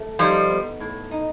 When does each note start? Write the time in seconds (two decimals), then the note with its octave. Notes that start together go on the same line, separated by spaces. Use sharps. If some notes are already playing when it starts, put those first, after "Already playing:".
Already playing: A3 E4
0.19 F3 G3 D#4
0.50 B3
0.80 A2
1.11 D#4